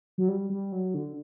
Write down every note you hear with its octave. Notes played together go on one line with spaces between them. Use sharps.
F#3
G3
G3
F#3
D3